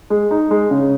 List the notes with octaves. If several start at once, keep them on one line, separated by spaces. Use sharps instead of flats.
G#3
D#4
G#3
C#3